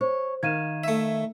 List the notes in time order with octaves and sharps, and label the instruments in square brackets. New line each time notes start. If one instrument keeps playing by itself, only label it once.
[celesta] C5 [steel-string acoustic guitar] C#5
[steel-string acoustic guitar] D#3 F5 [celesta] G#6 D#7 E7
[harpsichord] A3 E5